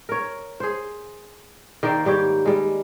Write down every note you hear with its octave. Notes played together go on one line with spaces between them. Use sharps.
A#4 C#5
G#4 C5
D#3 A#3 C4 D5
G#2 G3 G4 C#5
G3 G#3